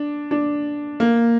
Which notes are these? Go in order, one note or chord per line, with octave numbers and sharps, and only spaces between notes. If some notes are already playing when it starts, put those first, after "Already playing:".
Already playing: D4
D4
A#3